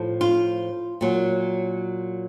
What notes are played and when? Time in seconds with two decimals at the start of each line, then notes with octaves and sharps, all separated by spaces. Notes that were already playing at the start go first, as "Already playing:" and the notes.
Already playing: A2 F3
0.21 F4
1.01 A#2 F#3